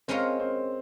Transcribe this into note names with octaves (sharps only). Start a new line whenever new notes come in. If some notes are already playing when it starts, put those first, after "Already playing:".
G#3 C4 C#4 F4 A#4 C#5
C4